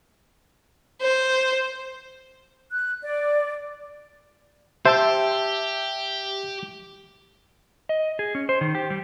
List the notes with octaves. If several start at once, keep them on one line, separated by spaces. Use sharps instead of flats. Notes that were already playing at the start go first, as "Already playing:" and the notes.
C5
F#6
D5
G4 C5 E5 A5 E6
D#5
G#4
C#4
C5
D#3
G4
G3